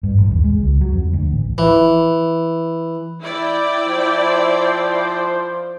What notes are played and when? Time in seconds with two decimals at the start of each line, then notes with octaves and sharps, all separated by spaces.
0.03 G2
0.18 A1
0.31 D#2
0.44 G#3
0.60 C#2
0.81 F#3
0.92 F2
1.13 D2
1.32 A1
1.58 E3
3.22 E4 D5 G5
3.87 F3 C5